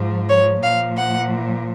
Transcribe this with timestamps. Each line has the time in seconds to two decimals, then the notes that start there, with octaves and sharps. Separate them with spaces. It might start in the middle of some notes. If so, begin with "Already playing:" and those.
Already playing: G#2 F3
0.29 C#5
0.62 A#2 F3 F5
0.97 F#5